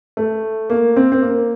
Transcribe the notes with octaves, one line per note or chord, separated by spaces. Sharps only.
A3
A#3
C4
C4
A#3